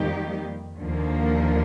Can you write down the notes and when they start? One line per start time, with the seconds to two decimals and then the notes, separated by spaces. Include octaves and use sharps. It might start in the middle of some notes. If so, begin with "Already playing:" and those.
Already playing: F2 D#3 G3 A#3 D#4 G4
0.80 D#2 D3 F3 A#3